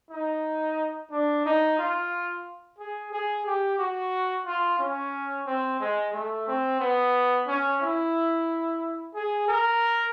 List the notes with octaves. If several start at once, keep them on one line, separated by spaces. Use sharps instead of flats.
D#4
D4
D#4
F4
G#4
G#4
G4
F#4
F4
C#4
C4
G#3
A3
C4
B3
C#4
E4
G#4
A#4